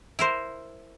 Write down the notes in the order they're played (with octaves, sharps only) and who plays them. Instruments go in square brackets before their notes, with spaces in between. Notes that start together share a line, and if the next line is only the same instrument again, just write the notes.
[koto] E4 A#4 C5